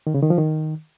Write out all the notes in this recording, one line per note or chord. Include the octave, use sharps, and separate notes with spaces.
D#3
C#3
D#3
F3
D#3